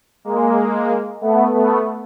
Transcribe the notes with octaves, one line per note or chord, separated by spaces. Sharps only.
G#3 A#3
A3 B3
A3 B3